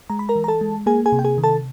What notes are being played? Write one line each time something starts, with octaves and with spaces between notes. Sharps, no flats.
G#3 A#5
B5
A#4 A#5
E3
A#5
A4 A5
G#3
A#3 G#4 G#5
G#4 G#5
C3
G5
G#4 G#5
D#3
A4 A5